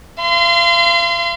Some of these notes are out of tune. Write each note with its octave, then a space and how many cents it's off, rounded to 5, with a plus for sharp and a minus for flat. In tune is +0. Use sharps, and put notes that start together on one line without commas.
F5 -40 C6 -25